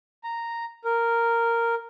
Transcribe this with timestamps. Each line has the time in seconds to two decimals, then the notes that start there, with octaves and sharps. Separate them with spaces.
0.24 A#5
0.85 A#4